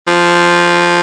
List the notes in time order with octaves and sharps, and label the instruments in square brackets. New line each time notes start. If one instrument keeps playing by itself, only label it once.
[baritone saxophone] F3